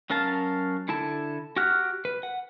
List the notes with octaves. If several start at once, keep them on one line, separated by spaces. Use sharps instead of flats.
F#3 C#4 A#4 F5 A5
D3 E4 A4 A5
F#4 G4 F#5 F6 F#6
B4
F#5